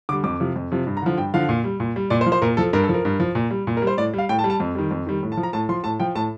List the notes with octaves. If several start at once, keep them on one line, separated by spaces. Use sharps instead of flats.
D3 G3 D6
F2 D6
C3 F3
F2
C3 F3
G2
A#5
D3 F3
G2 G5
D3 F3 F5
A#2
G3
A#2
G3
A#2 D5
C5
F3
C5
A#2 A#4
F3 A4
G2 A#4
A4
F3
A#4
G2
F3
A#2
G3
A#2
A#4
G3
C5
A2 D5
G3 F5
A2 G5
A5
G3
A5
F2
D#3 G3
F2
D#3 G3
A2
A5
F3
A#5
A2 A5
F3 C6
A2 A5
F3 G5
A2 A5